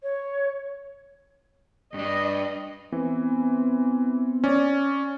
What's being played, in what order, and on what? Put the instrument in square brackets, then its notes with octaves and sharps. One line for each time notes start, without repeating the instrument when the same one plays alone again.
[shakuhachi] C#5
[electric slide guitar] G2 D4 [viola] D#5
[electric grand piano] E3 [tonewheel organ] B3 C4
[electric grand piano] C#4 D5